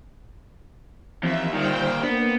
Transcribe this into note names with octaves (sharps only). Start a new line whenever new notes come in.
D#2 E3 F3 C4 E5
A#2 D3 D#3 G3 D#4 C5 G5
A#3 B3 D4